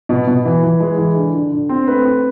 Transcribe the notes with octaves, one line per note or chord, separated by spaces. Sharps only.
B2
B2
E3
E3
G#3
E3
D3
D3
D3
C4
A3 B4
C4